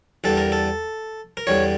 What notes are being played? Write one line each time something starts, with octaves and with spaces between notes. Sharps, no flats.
E2 D3 G3 A4
A#4
A4
A#4
E2 D3 G3 C#5